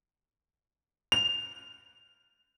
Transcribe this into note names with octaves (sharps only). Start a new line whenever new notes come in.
F7